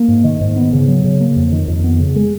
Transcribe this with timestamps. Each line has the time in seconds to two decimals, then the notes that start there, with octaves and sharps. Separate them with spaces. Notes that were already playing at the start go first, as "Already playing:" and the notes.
Already playing: A#3
0.08 G#2
0.24 D#3
0.41 G#2
0.56 B3
0.73 C#3
0.88 F#3
1.04 C#3
1.20 A#3
1.36 F2
1.52 D#3
1.68 F2
1.84 B3
2.00 C#3
2.16 G#3